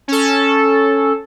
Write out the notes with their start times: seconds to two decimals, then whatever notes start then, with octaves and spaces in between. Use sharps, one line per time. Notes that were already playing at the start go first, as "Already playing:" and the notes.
0.08 C#4 A4